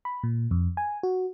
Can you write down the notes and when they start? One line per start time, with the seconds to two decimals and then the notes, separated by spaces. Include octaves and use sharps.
0.05 B5
0.23 A#2
0.51 F2
0.77 G#5
1.03 F#4